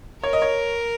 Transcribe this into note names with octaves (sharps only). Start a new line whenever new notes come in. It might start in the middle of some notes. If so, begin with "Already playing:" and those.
A#4 C#5
D#5
C#5